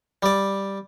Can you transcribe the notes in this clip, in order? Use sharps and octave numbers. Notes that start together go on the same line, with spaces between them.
G3 D5